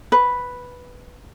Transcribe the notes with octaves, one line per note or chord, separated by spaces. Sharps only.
B4